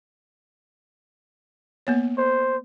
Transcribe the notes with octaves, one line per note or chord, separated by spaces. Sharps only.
A#3 B3 C#5
C5